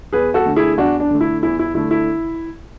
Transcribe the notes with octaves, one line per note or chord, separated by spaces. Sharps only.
E2 G#4 B4
F#4 A4
D3 A3
E4 G#4
E2 D4 F#4
D4
D3 A3
E4
E2 E4
E4
D3 A3 E4
E4